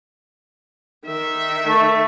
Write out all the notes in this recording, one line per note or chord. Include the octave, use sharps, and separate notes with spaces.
D#3 E5
A3